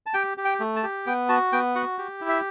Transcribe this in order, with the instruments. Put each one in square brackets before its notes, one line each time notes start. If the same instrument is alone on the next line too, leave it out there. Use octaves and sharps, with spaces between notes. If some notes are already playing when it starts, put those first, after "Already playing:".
[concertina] A5
G4 G5
G4
G5
A3
A5
G4
B3 G5
F#4 A5
B3 G5
F#4 F#5
G4
E4
E5